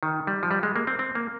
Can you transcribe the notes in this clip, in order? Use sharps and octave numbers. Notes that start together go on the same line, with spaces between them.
D#3
G3
F3
G3
G#3
A#3
C4
C4
A#3